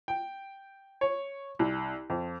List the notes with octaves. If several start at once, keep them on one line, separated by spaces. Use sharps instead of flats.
G5
C#5
C2
F2